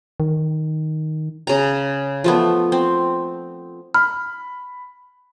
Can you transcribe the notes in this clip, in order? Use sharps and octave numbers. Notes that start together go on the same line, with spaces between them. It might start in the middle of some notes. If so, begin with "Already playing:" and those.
D#3
C#3 A#5
F3 A3 B3
C4
B5 F6